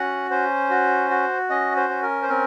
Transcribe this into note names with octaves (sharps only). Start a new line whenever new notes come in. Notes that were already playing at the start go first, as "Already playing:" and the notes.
Already playing: C#4 F#4 F#5
C#4 C5
F#4
F#4
C#4 D#5
C5
C#4
A#4
C5
C4 A#4